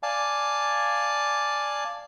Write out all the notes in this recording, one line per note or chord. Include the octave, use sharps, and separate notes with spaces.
D5 F5 G#5 A5